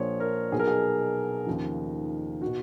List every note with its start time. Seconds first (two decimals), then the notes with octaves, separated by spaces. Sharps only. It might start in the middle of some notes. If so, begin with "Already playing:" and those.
Already playing: A#1 A#2 F3 C#5
0.20 A#4
0.52 B1 B2 G#4
0.59 A#4
0.67 G#4
1.46 D#2 C#3 F3
2.42 F#4
2.47 B2